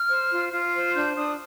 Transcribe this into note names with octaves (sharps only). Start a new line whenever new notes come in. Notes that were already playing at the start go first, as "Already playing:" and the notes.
Already playing: F6
C5
F4
F4
C5
D4 G6
D4 D#6